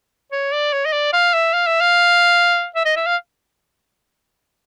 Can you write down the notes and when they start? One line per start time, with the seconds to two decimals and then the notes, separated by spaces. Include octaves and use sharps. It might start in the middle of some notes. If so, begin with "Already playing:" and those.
0.32 C#5
0.53 D5
0.73 C#5
0.86 D#5
0.93 D5
1.13 F5
1.34 E5
1.54 F5
1.67 E5
1.81 F5
2.76 E5
2.85 D#5
2.97 E5
3.07 F5